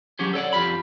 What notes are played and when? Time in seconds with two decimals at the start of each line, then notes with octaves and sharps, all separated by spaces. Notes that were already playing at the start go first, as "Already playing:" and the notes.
0.19 F#3 C#4 G4 G#4
0.34 A4 C#5 D5 F#5
0.53 F2 F4 G4 B5